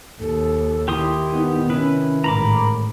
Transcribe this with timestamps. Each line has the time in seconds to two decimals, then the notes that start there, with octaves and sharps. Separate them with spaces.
0.20 D#2 A4
0.88 D#3 E4 G4 C6 D#6
1.32 B3 D#4
1.70 C3 C#4 E4 B4
2.24 A1 G#2 A#4 A#5 B5 D6